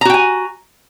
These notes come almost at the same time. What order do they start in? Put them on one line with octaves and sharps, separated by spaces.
A#5 F#4 G5 G#5